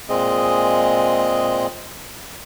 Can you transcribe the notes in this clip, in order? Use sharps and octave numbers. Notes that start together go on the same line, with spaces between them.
A#2 G#3 C4 G#4 D#5